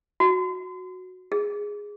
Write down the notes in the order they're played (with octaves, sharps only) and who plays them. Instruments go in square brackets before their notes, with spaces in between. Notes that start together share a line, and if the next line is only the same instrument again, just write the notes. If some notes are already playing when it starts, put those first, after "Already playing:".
[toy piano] F#4
G#4